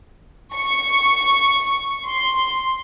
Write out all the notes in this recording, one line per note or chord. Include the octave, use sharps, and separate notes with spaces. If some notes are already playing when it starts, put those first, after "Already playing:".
C#6
C6